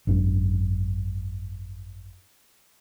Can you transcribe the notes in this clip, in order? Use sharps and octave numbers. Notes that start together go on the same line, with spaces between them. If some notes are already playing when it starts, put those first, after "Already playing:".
G#1 F#2 D4